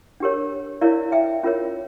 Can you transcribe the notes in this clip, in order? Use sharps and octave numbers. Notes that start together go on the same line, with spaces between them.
D4 G4 A#4 C#5
E4 A#4 C#5 D5 F5
E5 G5
C#4 F4 A#4 C#5